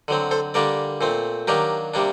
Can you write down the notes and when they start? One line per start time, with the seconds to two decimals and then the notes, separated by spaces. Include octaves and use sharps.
0.08 D3 F#3 C4
0.31 A4 C5
0.54 D3 G3 A#3 D4 A#4 D5
1.01 A#2 A3 C4
1.48 D#3 F#3 A#3 D4 G4 A#4
1.94 C3 G3 A#3 D4